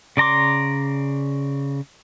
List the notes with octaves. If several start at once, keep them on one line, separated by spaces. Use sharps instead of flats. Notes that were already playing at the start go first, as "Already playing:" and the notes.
C#3 D5 A#5 C6 D6